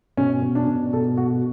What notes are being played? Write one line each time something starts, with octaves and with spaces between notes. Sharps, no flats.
B2 C#4
B2
D4
B2
B2 A4
B2 F#4